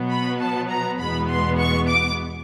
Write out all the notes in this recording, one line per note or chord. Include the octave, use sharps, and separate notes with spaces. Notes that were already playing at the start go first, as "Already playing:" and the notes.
Already playing: B2 F#3 B3
B5
A5
A#5
E2 B2 G#3 B3 B5
C6
C#6
D6